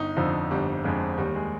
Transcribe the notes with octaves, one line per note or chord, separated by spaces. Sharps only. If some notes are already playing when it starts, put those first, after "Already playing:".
Already playing: G1 D#4
F2 D3 F3 D#4
G1 G3
F2 D3 F3 G#3
D#2 G3
G#3